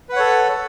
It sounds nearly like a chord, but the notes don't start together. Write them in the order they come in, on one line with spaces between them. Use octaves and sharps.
B4 F#5 C#5 A4